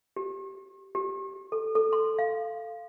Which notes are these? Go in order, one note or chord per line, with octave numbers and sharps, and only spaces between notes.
G4
G4
A4
A4
C6
F5